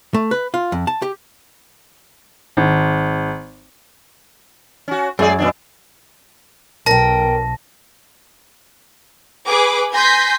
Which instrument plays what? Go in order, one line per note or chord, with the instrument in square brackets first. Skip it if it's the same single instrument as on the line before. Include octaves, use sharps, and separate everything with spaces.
[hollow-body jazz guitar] A3
B4
F4
F2
A5
G4
[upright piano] G#1
[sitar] C#4 F#4
[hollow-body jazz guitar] F#2 [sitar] G#3 G#4 D5
[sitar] A#2 B3 D4
[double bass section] B1 [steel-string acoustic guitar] A#4 G5 [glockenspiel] A5 A#6
[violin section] G#4 B4 D6
G#5 C6 G6 A#6 B6